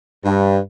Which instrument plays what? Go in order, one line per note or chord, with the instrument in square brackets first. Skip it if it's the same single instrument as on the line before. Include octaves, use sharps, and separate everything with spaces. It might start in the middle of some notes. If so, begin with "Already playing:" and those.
[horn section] G2